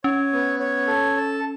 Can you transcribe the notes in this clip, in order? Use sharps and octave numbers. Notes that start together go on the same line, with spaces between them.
C#4 C#5
B3
C#5
A4
A5